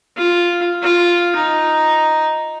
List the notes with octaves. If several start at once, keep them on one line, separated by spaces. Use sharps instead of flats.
F4
F4
D#4